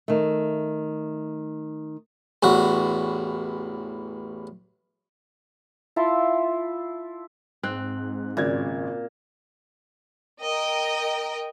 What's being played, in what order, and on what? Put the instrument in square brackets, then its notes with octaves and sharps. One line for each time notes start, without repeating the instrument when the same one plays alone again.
[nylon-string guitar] D#3 A3
[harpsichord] A1 E2 F#4
[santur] E4 F4 A5 C6
[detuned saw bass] G#2 [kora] C4 [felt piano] F#6
[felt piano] G#1 C#3 G#6 [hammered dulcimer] A#2
[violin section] A#4 D#5 G5